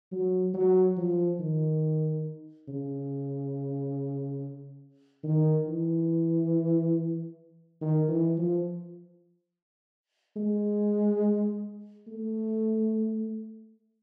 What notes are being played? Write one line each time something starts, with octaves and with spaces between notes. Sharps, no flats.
F#3
F#3
F3
D#3
C#3
D#3
E3
D#3
E3
F3
G#3
A3